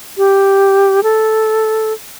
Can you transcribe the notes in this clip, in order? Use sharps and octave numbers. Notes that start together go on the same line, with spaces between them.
G4
A4